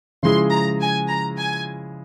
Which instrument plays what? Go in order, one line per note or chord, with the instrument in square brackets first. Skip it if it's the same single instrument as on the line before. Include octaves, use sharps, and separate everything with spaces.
[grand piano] C#3 F3 G#3 E4 G#4 [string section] C6
[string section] A#5
G#5
A#5
G#5